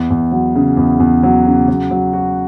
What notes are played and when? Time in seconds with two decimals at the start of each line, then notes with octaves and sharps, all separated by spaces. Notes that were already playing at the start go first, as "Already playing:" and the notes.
Already playing: E2
0.10 E2
0.32 F#3
0.55 C#3
0.77 E2
1.00 E2
1.23 F#3
1.46 C#3
1.68 F#3
1.91 F#3
2.13 F#4